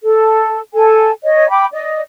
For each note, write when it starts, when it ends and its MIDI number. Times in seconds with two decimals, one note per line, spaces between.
0.02 0.59 69
0.73 1.10 69
0.73 1.10 80
1.24 1.46 73
1.24 1.46 75
1.49 1.66 79
1.49 1.66 83
1.49 1.66 86
1.73 2.00 74
1.73 2.00 75